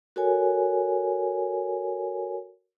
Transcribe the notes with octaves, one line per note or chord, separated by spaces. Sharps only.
F#4 A4 A#4 C#5 G#5